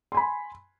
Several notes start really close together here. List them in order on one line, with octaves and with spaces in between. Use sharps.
C6 G#5 B5